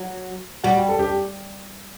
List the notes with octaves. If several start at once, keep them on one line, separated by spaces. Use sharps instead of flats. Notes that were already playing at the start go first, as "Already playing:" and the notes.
Already playing: F#3
G3 F#4
A4
G4